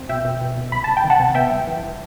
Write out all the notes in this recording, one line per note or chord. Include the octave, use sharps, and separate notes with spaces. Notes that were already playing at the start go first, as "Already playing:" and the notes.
Already playing: C4
B2 E5 G5
B2
B2
B2
C2 B5
C3 A5
G5
D#3
F#5 A5
C3
B3 E5 G5
G2
E3